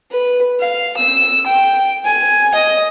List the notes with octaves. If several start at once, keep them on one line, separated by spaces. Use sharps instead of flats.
B4
F5
E6
G5
G#5
D#5